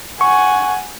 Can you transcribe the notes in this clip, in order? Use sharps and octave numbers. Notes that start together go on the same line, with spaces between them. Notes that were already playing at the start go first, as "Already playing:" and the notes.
F#5 G#5 C#6